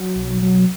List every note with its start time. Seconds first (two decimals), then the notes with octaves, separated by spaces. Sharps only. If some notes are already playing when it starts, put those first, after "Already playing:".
Already playing: F#3
0.15 B1
0.42 F#3